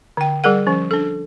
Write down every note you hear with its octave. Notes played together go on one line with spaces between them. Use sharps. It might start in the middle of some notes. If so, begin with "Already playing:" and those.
D3 G5
G3 G#4 A#4 F#5
F3 C#4
D4 A4